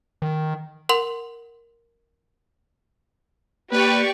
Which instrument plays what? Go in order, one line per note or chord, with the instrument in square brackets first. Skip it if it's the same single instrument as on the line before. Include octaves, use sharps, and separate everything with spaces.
[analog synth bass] D#3
[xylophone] A#4 F#5 C6 F#7
[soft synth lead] A#3 [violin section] G4 D5 C#6 [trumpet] B4